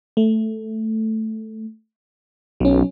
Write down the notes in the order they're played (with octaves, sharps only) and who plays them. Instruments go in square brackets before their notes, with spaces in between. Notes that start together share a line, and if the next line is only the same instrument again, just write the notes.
[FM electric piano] A3
[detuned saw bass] B1 [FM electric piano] F#3 C#4